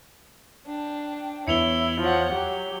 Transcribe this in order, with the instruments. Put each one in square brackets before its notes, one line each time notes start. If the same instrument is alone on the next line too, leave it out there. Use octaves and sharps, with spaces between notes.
[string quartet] D4 G5
[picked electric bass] E2 B3 [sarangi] E4 [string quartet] C#5 [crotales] C#7 F7 G7
[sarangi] F3 [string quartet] C#5 F#5
[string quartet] F#3 [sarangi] G4